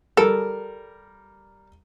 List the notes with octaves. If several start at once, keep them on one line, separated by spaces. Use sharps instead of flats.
G3 A4 A#4